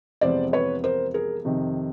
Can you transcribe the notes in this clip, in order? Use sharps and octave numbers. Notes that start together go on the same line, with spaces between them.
F2 C3 E3 G#3 B3 C5 D5
B4 C#5
A#4 C5
G#4 A#4
F2 C3 D#3